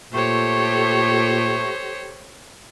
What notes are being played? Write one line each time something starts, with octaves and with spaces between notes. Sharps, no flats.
A#2 A3 G4 A4 C5 C#5